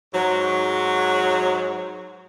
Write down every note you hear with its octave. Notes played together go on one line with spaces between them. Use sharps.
G#2 F#3